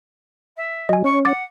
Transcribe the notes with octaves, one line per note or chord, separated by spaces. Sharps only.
E5
F#3 D#5 G#5
C#4 C#6
F#5 D6 A6